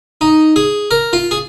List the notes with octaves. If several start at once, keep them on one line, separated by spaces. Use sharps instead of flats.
D#4
G#4
A#4
F4
G#4